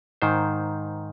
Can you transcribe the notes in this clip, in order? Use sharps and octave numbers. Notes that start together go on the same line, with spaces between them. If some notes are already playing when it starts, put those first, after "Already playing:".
G#2 D#3 C5